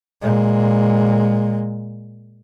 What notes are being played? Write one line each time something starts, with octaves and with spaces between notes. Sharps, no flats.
A#2 G#3